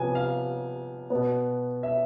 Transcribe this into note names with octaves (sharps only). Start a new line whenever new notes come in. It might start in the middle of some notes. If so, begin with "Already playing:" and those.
Already playing: C3 F3 B3 G#5
F5
B2 B3
E5